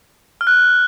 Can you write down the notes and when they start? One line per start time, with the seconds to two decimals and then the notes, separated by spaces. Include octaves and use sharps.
0.41 F6
0.47 F#6